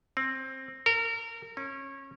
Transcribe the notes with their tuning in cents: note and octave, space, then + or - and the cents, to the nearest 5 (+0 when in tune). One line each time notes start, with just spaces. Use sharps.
C4 +15
A#4 -25
C#4 -25